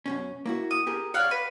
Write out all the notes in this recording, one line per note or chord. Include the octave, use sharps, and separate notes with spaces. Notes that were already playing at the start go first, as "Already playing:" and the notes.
F#2 B2 C#4
A#3 E4 F#4
D#6
G4 G#4 A#4
G4 C#5 D5 F5 F#5
B4